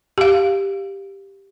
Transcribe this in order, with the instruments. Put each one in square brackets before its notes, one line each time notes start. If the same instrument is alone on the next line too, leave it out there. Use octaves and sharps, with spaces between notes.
[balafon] G4 F5